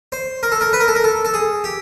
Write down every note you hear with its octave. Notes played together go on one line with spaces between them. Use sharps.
C5
A#4
A4
A#4
B4
A#4
A4
A#4
A4
A4
G#4
G4